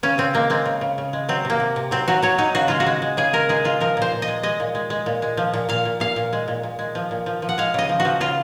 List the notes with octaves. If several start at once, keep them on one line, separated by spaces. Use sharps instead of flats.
C#3 C#4
C#3 C4
G#3 A#3
G#3 C4
C#3
C#3
C#3
G#3
F#3 C4
C3 A#3
C3
C3
F#3 C4
F#3 F#4
F#3 C#5
F#3 D#4
C#3 F#4
G#3 F4
F#4
G#3
G#3
C#3 G#4
G#3 A#4
G#3 G#4
G#3 F4
F3 A#4
A#2 C5
A#2
D#5
G#3
G#3 D#5
A#2
G#3
G#3
A#2
G#3
F3
A#2
A#2 F5
A#2
A#2 F5
A#2
G#3
A#2
A#2
G#3
F3
A#2
F3
F3
F#5
G#3 F5
C#3 D#5
F3
F#4
F3
C#3 F4